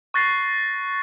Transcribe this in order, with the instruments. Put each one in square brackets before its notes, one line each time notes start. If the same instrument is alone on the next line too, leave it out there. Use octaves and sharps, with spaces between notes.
[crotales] C#6 F#6 A6 A#6 C7